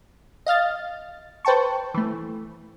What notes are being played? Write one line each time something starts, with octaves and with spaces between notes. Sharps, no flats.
D#5 F5 F6 A6
B4 C5 G5 A5 C#6
E3 A3